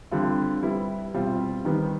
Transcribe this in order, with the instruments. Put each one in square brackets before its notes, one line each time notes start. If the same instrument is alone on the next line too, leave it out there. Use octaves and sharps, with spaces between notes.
[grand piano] D3 G3 C4 F4
G3 B3 E4
B2 G3 C4 F4
D#3 G3 B3